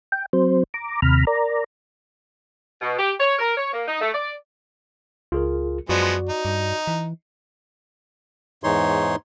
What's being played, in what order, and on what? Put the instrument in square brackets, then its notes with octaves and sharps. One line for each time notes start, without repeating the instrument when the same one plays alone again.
[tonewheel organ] G5
F#3 C4 C5
A#5 D6
D#2 C3 A#5 B5 F6
A#4 D5 A#5
[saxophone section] B2
G4
C#5
A#4
C#5
A#3
D#4
A3
D5
[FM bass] C#2 [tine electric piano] F4 G#4 A#4
[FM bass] F#2 [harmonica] F3 G#3 B3 [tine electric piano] F#4 D5
[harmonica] D#4
[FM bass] G2
E3
[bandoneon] E2 G#2 E3 D#4 C#5 C6